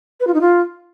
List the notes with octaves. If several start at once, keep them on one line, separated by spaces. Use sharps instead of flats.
B4
F4
D#4
F4